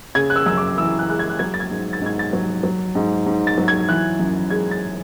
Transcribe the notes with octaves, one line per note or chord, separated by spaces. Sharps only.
C#3 G#6
F#6
E6
F#2 E6
D6
E3 E6
F#6
G#3 F#6
G#6
F#6
F#3 G#6
A6
G#6
G#2
A6
G#2 G#6
A6
F#3
F#3
G#2
G#2
A6
F#3
G#6
E3 F#6
F#2
G#3 G#6
A6